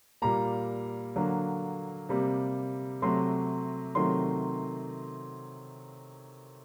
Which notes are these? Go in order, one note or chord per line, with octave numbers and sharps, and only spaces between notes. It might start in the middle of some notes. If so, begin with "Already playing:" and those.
A#2 G3 A#3 A#5
D3 F#3 A#3
C3 G3 A#3
C3 F#3 A3 C6
C3 D#3 F#3 A3 C6